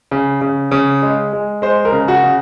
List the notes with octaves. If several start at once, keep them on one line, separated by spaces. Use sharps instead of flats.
C#3
C#3
C#3
G#3
G#3
G#3 C5
A#4
C#3
F#4
C#3